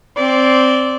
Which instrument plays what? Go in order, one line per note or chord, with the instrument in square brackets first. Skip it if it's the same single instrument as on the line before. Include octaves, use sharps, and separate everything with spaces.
[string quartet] C4 D5